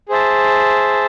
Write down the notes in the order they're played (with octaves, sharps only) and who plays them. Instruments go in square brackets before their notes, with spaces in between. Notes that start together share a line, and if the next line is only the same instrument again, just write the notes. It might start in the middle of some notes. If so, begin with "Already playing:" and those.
[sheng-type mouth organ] G#4 C5 E5 A5